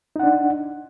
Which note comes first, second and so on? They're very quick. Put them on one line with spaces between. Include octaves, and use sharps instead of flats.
D#4 F#5 D4